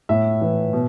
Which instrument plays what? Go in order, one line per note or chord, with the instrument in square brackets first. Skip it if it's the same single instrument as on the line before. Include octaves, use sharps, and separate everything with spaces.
[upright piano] A2 E5
E3
B2